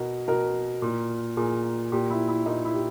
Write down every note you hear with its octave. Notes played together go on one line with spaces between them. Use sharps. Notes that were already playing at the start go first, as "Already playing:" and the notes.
Already playing: B2 A#4
B2 A#4
A#2
A#2 G#4
A#2 G4
E4
E4
A#2 D#4
E4
G4